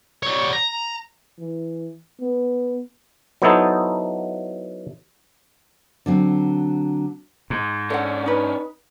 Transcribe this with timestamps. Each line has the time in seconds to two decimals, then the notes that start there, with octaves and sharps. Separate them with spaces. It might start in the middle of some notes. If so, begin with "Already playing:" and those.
0.23 G3 C#5
0.53 A#5
1.40 E3
2.21 B3
3.42 F#3 B3 D#4 E4 A4 C5
6.06 D3 F#3 C4
7.50 G#2
7.90 C#4 D4 A4 C5 F#5
8.26 D#4 B4